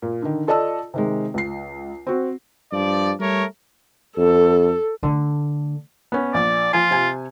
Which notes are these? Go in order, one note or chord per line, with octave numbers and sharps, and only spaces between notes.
A#2
D3 D#3
F4 A4 D5 D#5 A5 E6
C3 D#3 G#3
C#2 C7
C4 F#4
G2 F3 D5
G3 A3 A#4 C#5
F2 A4
D3 A3
B3 C#4
A#1 D5
F3 F4 G#5
C3 G#5